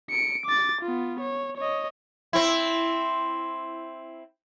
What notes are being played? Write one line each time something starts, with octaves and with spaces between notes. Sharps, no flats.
C#7 D7
D6 A6
B3 F4
C#5
C#5 D#5
C4 E4